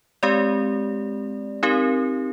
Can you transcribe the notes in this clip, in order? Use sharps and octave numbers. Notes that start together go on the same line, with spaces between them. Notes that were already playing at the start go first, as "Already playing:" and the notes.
G#3 C4 G4 D5
C4 D#4 G4 A#4